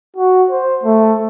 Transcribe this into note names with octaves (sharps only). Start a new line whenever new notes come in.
F#4
C5
A3